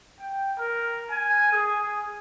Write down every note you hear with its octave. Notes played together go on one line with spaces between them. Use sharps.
G5
A#4
G#5
G#4